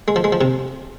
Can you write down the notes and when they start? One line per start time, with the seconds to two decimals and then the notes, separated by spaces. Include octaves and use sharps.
0.08 G#3
0.16 F3
0.24 G#3
0.32 F3
0.41 C3